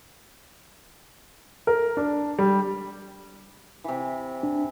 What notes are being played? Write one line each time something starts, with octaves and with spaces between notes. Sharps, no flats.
A#4
D4
G3
C3 E3
D4